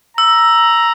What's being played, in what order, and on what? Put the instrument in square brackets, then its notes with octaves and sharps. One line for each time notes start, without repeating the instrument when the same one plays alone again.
[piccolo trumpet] A#5 [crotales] E6